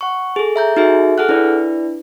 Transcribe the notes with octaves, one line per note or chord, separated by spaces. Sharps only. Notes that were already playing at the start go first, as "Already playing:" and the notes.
F#5 C#6
G#4 A4
E5 A#5 G6
D#4 F#4 G#4 A4 E5
G#4 A4 F#5 F6 F#6
D4 E4 B4 D5